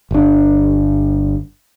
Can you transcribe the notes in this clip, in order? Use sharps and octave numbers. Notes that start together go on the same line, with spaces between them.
G1 D4